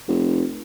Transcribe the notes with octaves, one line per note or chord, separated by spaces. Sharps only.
F1